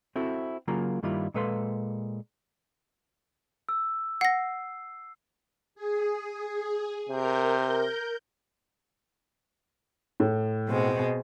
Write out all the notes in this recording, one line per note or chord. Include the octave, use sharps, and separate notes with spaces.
C4 E4 F#4 A4
C#3 F#3 A#3 F4 A#5
G2 D#3 G3 A#3 E4 F4
A#2 G#3 A4 B4 F5 C6
E6
F#5 A#6 C7
G#4
C3 A#4 G6
A2
B2 G#3 C4